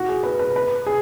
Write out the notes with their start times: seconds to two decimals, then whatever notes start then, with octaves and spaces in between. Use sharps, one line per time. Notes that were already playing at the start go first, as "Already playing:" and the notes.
Already playing: F#4
0.08 G#4
0.23 B4
0.39 B4
0.56 B4
0.86 G#4